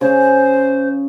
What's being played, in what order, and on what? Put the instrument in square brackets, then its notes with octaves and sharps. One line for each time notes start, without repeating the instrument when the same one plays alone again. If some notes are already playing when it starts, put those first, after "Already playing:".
[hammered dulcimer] C#3 [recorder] C5